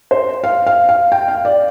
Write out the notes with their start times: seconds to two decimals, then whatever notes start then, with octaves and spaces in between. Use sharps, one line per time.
0.11 C5
0.44 F5
0.67 F5
0.89 F5
1.12 G5
1.28 F5
1.45 D5